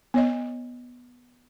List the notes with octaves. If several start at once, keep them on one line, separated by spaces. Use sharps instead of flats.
B3 C#5 D#5